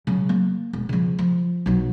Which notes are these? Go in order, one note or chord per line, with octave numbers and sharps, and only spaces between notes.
C#3 F#3
A#3
E1
C#3 F3
F3
B1 F#3